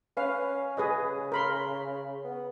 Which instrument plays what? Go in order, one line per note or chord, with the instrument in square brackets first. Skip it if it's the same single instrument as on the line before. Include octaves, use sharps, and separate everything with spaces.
[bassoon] C#4 [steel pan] B4 F5
[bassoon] C#3 [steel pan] G#4 B4 D#5
[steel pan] A#4 B5 C6
[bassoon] B3